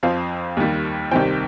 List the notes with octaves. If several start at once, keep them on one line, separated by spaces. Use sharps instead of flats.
F2 F3 C4 F5
D#2 D#3 G3
C2 C3 D#3 C4 G5